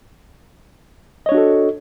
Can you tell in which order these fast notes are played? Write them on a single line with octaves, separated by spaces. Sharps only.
D#5 C#5 D4 F#4 A4